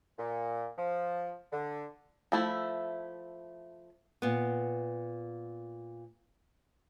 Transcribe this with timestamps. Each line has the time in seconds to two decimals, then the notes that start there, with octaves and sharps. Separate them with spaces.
0.18 A#2
0.78 F3
1.53 D3
2.32 F3 A3 E4
4.22 A#2 B3